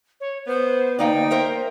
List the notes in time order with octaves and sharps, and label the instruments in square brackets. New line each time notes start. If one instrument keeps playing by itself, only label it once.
[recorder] C#5
[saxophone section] B3 [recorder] C5
[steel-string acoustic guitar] D2 A#3 D5 [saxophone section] D#4 [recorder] G5
[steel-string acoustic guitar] A#4 C5 E5